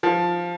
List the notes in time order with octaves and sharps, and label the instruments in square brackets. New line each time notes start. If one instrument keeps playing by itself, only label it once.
[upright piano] F3